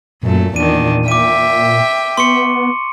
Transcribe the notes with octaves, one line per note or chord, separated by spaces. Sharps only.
F#2 A#2 A3
E2 D#3 D4 D#7
E5 G5 D6 D#7
B3 C6 C#6 C#7